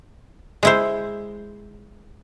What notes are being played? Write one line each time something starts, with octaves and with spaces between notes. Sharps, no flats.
G#3 E4 C5